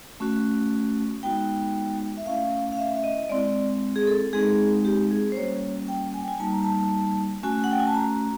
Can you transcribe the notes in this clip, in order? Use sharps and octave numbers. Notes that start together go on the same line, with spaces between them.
A3 C#4 F#4
G#3 B3 D#4 F#4 G5
E5
A3 C#4 E4 F5
F5
E5
E5
D#5
D#5
G#3 C4 E4 D5
G#4
A4
G#3 C4 D#4 G#4
G4
G#4
C5
G3 A#3 C#4 F#4 C#5
G5
G#5
G5
G#5
G3 A#3 D#4 F#4 A5
A#5
A5
A3 C#4 F#4 G#5
F#5
G5
G#5
A5
A#5